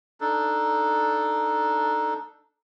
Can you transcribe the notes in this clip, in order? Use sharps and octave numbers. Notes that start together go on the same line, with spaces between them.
D4 D#4 A4